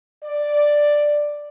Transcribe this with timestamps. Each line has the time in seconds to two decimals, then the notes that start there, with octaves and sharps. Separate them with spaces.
0.24 D5